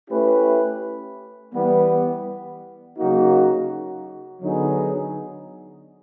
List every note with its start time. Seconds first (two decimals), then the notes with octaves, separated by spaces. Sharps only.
0.10 A3 C#4 E4 G4 B4
1.54 E3 G3 B3
2.98 C#3 F#3 A#3 D#4 F#4
4.41 D3 F#3 B3 D#4 G#4